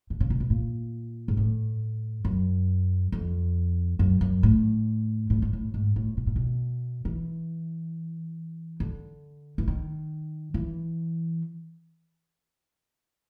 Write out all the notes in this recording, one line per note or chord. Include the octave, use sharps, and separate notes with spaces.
D3
C#3
C3
B2
A#2
G#2
A2
F#2
F2
F#2
F#2
A2
A2
G#2
A2
G#2
A2
B2
A#2
B2
E3
D3
E3
D#3
E3